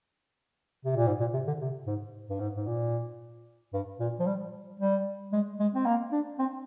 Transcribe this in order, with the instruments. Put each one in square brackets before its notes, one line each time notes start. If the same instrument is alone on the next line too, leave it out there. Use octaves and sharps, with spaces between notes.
[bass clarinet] C3
A#2
G#2
A#2
C3
D3
C3
G#2
G2
G#2
G#2
A#2
G2
A#2
F3
G3
G3
G#3
G#3
C4
A#3
D4
C4